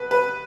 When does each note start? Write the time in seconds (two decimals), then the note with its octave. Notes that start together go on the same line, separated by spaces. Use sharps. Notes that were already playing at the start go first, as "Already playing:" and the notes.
Already playing: B2 B4
0.11 B4